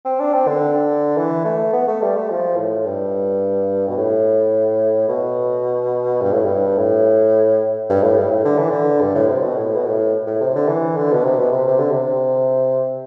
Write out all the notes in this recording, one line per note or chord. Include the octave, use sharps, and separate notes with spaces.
C4
D4
C4
D3
E3
A3
B3
A3
G3
A3
F3
A2
G2
B2
A2
B2
G2
A2
G2
A2
G2
A2
G2
A2
D3
E3
D3
G2
A2
C3
B2
A2
B2
A2
A2
C3
D3
E3
D3
B2
C3
B2
C3
C3
D3
C3